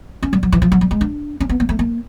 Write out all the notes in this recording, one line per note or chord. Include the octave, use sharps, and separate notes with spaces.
C#4
G3
F#3
E3
F3
F#3
G3
G#3
D4
C#4
B3
A#3
A3
A#3